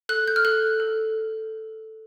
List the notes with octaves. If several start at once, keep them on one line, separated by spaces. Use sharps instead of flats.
A4 F#6
G6
F6
A4 F#6
A4